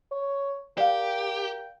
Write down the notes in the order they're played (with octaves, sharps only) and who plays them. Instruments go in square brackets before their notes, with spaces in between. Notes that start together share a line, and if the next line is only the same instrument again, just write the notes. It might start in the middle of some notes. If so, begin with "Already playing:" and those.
[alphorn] C#5
[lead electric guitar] G4 [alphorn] A#4 [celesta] D5 F5 [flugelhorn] G5